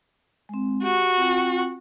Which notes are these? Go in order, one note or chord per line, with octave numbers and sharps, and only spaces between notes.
G#3 C4
F#4 G4
C4 F4 G5